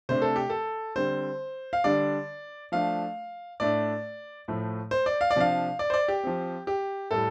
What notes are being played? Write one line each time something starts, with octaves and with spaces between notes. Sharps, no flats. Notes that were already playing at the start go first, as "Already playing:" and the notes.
C3 A3 D4 C5
A4
G4
A4
D3 G3 C4 C5
F5
D3 G3 D4 D5
F3 A3 D4 F5
A2 A3 D4 D5
A2 F3 A3
C5
D5
F5
D5
C3 F3 D4 F5
D5
C5
D5
G4
F3 C4
G4
A2 G3 A4